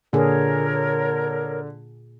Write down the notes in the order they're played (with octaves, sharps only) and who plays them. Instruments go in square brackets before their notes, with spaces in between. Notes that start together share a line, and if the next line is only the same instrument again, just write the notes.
[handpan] A#2 G#4 [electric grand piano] D3 [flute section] A#4 C#5